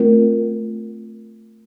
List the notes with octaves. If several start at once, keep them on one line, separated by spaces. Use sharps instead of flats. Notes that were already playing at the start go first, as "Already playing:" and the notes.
Already playing: A3 C4 F4 A#4